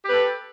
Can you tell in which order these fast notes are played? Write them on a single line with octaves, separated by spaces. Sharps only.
G4 B4 A4